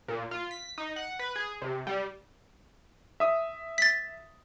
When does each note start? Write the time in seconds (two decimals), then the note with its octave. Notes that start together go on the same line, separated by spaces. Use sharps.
0.08 A#2
0.31 F4
0.51 B6
0.78 D#4
0.96 F#5
1.19 B4
1.36 G#4
1.62 C3
1.87 G3
3.20 E5 D#6
3.78 A6 B6